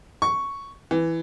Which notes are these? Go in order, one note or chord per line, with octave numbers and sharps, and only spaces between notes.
C#6
E3